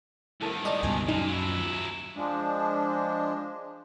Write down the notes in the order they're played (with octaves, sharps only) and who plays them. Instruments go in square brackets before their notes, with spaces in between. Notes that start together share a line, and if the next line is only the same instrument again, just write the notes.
[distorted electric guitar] C2 D#3 [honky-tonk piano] E4 A4 A#4
[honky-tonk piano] G#3 A5 F7 [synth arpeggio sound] D5 D#5
[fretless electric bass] C#2 G2 B2 [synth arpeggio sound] G#5
[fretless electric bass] F#2 [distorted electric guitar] A#2 [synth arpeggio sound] D#4
[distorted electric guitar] F#3 E4
[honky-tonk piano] D#2 F3
[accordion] F3 G#3 D4